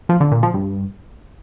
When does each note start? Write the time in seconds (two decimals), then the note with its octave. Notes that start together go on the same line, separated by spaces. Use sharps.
0.09 F3
0.20 D3
0.32 A#2
0.43 F3
0.54 G2